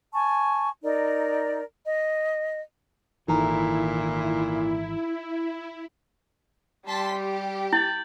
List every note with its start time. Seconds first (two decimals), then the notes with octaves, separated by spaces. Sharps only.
0.13 G#5 A5 C#6
0.82 D#4 A#4 D5
1.85 D#5
3.28 G#1 A#2 D#3 E3 D#4 E4 A4 A#5
6.87 G3 A5 C6 B6
7.17 G4
7.73 E4 G6 A6 F#7